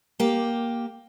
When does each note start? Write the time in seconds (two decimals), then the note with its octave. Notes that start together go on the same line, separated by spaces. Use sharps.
0.20 A#3 G4